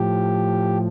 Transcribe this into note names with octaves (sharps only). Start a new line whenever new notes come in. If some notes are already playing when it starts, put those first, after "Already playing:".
Already playing: A2 F3 G4